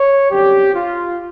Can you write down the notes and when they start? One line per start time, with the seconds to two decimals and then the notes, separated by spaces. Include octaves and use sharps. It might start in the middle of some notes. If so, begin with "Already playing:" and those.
Already playing: C#5
0.30 F#2 D3 G3 C4 G4
0.74 F4